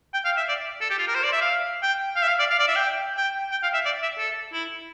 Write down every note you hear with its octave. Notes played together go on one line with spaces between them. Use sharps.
G5
F5
E5
D5
A4
G4
F4
A#4
C5
D5
E5
F5
G5
F5
E5
F5
D5
F5
D5
E5
G5
G5
G5
F5
E5
D5
E5
A4
E4